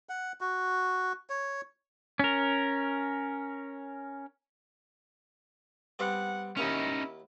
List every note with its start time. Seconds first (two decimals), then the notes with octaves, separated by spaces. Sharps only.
0.09 F#5
0.41 F#4
1.30 C#5
2.19 C#4 A#4
5.99 G3 B3 C4 F#5
6.57 D#2 A#3 C#4 D#4 E4 C#6